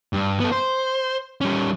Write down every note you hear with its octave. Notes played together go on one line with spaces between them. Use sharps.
G2
B3 A4
C5
G3 C#4